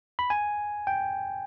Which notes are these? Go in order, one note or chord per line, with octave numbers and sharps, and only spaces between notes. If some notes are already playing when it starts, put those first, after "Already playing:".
B5
G#5
G5